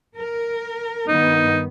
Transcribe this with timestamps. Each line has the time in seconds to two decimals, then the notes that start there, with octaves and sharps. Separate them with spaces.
0.17 A#4
1.08 G2 D#3 B3 D#4